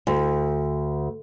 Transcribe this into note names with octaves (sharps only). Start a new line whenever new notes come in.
D2